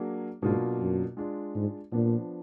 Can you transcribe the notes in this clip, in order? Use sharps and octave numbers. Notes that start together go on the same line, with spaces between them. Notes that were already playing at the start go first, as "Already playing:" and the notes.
Already playing: F#3 A#3 D4 G#4
G#2 B2 F#3 A#3 D4 F4
F#2
G#3 D4 F4
G#2
A#2 F3 B3 D4